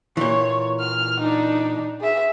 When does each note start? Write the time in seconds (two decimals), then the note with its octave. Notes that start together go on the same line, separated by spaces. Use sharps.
0.17 A#2 E3 C#5
0.80 F6
1.21 D4 D#4
2.01 G#4 E5